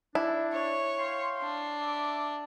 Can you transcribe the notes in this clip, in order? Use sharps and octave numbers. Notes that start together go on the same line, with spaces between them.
D4 E4
C#5
F5 G5 C6
D4
E5 D6